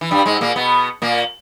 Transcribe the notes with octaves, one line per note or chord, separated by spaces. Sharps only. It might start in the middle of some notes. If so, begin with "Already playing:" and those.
E3
G2 G3
G#2 G#3
A#2 A#3
B2 B3
A#2 A#3